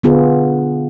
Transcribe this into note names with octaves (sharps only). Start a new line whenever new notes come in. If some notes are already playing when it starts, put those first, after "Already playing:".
D3 B3 F4 G#4